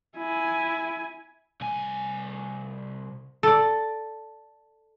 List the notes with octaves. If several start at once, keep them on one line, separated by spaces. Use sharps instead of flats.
E4 G#5
C2 G#5
A4 D5